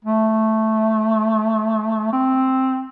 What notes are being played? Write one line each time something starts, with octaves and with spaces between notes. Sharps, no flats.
A3
C4